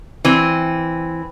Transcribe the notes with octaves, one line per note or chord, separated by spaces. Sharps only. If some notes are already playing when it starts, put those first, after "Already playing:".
E3 C4